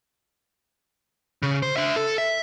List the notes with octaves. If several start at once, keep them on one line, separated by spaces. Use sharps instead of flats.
C#3
C5
D4 E5
A4
E5